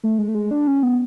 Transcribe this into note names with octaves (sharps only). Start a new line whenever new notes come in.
A3
G#3
A3
G#3
D4
C#4
B3